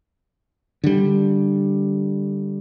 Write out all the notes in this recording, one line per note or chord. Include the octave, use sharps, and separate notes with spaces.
D3 G3